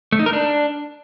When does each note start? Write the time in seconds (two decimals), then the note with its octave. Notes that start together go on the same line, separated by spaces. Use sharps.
0.12 A3
0.19 D#4
0.26 A#4
0.33 D4